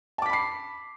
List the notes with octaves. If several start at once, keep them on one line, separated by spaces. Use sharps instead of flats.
A5 B5 D6 B6 C7